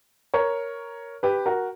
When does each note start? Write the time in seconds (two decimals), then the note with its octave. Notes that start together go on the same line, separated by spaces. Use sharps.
0.34 A#4 C#5
1.23 G4 B4
1.46 F#4 A#4